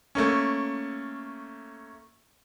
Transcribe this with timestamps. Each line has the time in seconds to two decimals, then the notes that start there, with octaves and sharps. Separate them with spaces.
0.15 A3 A#3 C#4